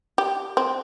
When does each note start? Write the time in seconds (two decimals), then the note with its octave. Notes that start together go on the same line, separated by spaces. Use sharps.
0.18 G4
0.57 C4